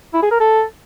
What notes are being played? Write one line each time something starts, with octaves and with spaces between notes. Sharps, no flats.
E4
G#4
A#4
A4